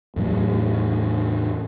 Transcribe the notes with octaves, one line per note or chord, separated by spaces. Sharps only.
E2 A2 F#3 A3